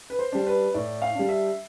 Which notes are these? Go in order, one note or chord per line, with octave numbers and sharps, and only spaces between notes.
B4
C5
G3 D4
B4
A2 D5
F5
G3 D4
E5